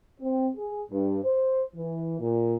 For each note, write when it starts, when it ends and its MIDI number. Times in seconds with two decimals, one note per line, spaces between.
0.21 0.48 60
0.57 0.82 68
0.91 1.19 43
1.24 1.62 72
1.75 2.15 52
2.20 2.55 46